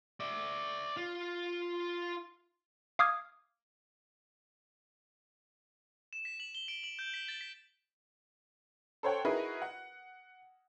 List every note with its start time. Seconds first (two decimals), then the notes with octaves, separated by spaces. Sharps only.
0.20 D5 E5
0.97 F4
2.99 F5 D6 D#6 F6 G#6
6.13 E7
6.25 B6
6.40 F#7
6.55 G7
6.68 D7
6.83 F#7
6.99 G6
7.14 B6
7.28 A6
7.41 B6
9.03 A4 C5 C#5 F#5 G5
9.25 D#4 E4 F#4 G#4 A#4 B4
9.62 F#5